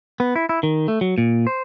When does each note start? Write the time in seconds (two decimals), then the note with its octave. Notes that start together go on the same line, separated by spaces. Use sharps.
0.20 B3
0.36 E4
0.49 E4
0.63 D#3
0.88 A3
1.01 F#3
1.18 A#2
1.47 C5